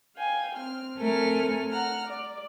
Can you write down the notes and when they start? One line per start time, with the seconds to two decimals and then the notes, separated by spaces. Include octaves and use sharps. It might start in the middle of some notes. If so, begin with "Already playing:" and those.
0.16 F5 G5 G#5
0.55 C4 F6
0.97 A3 C4 A4 A#4 G#5 F6
1.70 F#5 A#5 F6
2.06 D5